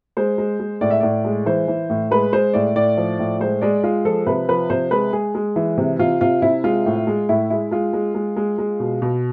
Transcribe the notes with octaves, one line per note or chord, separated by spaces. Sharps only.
G#3 C5
G#3
G#3
A2 D5
E5
A2 D5
G#3
E3 C5
E3
A2
G#3 B4
G#3 C5
A2 D5
A2 D5
F3
A2
G#3 C5
G#3 D5
G#3 F4
F3 A4
C3 B4
F3 B4
C3 C5
G#3 B4
G#3 G#4
G#3
E3
C3
C3 F4
C3 F4
C3 E4
G#3 F4
A2
G#3
A2 E4
G#3 E4
G#3 F4
G#3
G#3
G#3
G#3
B2
B2